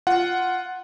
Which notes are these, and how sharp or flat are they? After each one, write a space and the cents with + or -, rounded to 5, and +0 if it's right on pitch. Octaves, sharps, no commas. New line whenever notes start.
F4 +0 F#5 +0